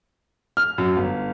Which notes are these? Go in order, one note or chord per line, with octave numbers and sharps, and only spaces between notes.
F6
F#2
G1